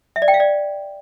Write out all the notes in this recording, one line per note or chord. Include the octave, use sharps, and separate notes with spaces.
E5
D5
G5
F5
D5